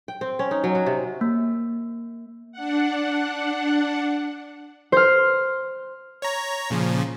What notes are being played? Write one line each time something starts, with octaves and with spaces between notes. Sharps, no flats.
G5
C4
C#4
D#4
F#3
F#4
C3
A#3
D4 F#5
C5 F6
C#5 A#5
A#2 C#3 F3